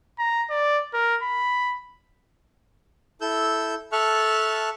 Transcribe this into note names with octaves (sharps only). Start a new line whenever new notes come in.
A#5
D5
A#4
B5
E4 A4 E6 G6
A4 E5 A5 C#6 F6 F#6